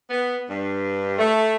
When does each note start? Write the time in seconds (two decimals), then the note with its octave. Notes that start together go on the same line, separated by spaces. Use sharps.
0.10 B3
0.49 G2
1.18 A3